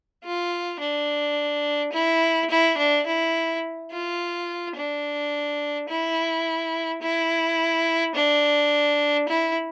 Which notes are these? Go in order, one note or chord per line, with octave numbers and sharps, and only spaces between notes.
F4
D4
E4
E4
D4
E4
F4
D4
E4
E4
D4
E4